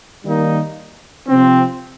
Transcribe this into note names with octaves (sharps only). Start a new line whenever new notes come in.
D#3 G3 A#3 D#4
C3 F3 C4